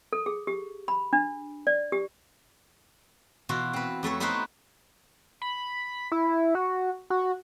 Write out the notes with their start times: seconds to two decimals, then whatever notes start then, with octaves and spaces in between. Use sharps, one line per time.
0.13 A4
0.26 G#4
0.47 G4
0.88 B5
1.13 D4
1.67 D5
1.92 G4
3.49 B2 E3 F4 F#4
3.73 C4 B4
4.03 F2 A3 A4 C#5
4.20 B3 D#4 E4 F#4 B4 C5
5.42 B5
6.12 E4
6.55 F#4
7.10 F#4